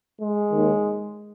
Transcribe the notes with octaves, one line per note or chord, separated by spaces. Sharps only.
G#3
D#2 D#3